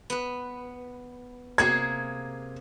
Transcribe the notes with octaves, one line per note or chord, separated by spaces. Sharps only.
B3 B4
C3 A#3 G#4 G#6